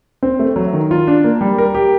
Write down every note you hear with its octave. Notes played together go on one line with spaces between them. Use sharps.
C4
A3
F#3
D#3
F4
D4
A#3
G3
A#4
G4